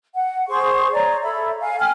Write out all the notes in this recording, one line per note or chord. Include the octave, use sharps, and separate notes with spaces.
F#5
G#4 C5 C#6
C#5 D5 A#5
A4 E5 B5
F5 G#5
G5 G#5 F6